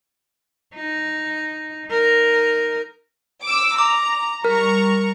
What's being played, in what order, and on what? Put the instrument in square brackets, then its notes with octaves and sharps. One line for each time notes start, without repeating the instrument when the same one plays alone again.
[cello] D#4
D#4 A#4
[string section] D6 E6
[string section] A#5 [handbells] D6
[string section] G3 A#5 C#6 [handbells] A#4